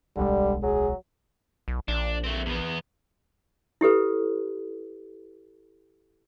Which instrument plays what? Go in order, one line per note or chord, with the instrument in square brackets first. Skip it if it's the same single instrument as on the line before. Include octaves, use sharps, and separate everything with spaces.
[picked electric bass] D1 B1 G#3 [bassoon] D3 [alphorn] G3
[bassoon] F#3 [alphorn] G#4
[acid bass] B1
[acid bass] A#1 [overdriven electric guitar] D4
[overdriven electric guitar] A3 C4
E2 B3
[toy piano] E4 G4 A4 B4